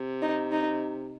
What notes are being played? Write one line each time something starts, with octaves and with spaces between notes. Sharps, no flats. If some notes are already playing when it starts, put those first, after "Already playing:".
Already playing: C3
D#4
D#4